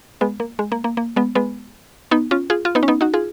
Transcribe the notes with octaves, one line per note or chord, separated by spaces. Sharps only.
G#3 B3
A#3
G#3
A#3
A#3
A#3
G#3 B3
G#3 B3
B3 D#4
C#4 F4
F4 G#4
F4
B3 D#4
C#4
B3 D#4
D#4 F#4
F4 G#4